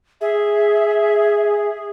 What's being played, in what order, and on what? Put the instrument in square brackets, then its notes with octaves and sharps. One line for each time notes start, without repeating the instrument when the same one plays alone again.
[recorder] G#4 [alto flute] E5